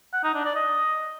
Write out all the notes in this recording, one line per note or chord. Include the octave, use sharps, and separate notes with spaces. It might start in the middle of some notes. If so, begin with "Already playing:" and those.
F#5
D#4
D4
D5
D#5